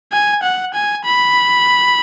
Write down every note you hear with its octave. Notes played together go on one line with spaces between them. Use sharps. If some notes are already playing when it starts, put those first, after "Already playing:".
G#5
F#5
G#5
B5